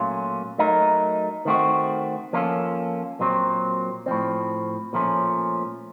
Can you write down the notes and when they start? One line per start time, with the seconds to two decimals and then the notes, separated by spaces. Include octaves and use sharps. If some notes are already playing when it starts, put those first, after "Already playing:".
Already playing: A#2 F#3 A3 C#4 F4
0.58 F#3 A3 D#4 A#4
1.45 D#3 A3 C4 F#4
2.33 F3 A#3 C#4 F4 A4
3.20 A#2 F#3 C4
4.06 A2 F3 C4
4.93 A#2 F3 A3 C#4